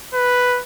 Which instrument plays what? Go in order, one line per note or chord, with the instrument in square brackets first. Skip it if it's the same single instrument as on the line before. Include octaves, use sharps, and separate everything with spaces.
[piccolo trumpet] B4